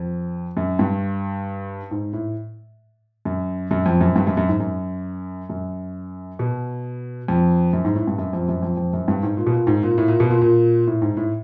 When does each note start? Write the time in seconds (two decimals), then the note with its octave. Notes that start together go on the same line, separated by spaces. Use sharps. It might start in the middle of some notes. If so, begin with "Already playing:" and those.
Already playing: F2
0.57 F#2
0.79 G2
1.91 G#2
2.13 A2
3.25 F#2
3.71 F#2
3.86 F2
4.01 F#2
4.16 G2
4.27 F#2
4.37 F#2
4.49 G#2
4.60 F#2
5.49 F#2
6.39 B2
7.28 F2
7.73 F#2
7.85 G#2
7.95 A2
8.07 G2
8.18 F#2
8.33 F2
8.49 F#2
8.63 F2
8.77 F2
8.93 F#2
9.08 G2
9.23 G#2
9.37 A#2
9.47 B2
9.53 A#2
9.67 G#2
9.83 A#2
9.98 A2
10.08 A#2
10.20 B2
10.30 A#2
10.42 A#2
10.87 A2
11.02 G#2
11.17 A2